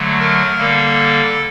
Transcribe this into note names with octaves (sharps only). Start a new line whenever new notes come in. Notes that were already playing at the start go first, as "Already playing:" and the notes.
Already playing: D3 F#3 A3
A#4
D3 G3 A#3 A4